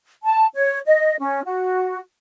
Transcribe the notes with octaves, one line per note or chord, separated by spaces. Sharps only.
A5
C#5
D#5
C#4
F#4